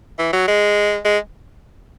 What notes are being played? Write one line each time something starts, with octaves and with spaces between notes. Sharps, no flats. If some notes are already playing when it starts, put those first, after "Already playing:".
E3
F#3
G#3
G#3